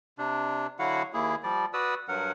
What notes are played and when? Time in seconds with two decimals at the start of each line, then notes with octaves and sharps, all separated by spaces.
0.18 C3 D4
0.79 D3 F#3 E4 F#4 F5 F#5
1.14 D#2 A#3 E4 G#4
1.43 F3 G3 D5
1.73 F#4 B4 D5 D#6 E6
2.08 G2 F#3 A#4 F#5